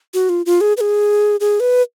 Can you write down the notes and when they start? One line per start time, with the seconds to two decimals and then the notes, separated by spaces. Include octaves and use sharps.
0.14 F#4
0.29 F4
0.46 F4
0.61 G#4
0.77 B4
0.81 G#4
1.40 G#4
1.60 B4